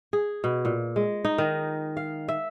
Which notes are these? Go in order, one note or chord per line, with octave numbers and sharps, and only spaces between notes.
G#4
B2
A#2
G#3
D#4
D#3
F5
E5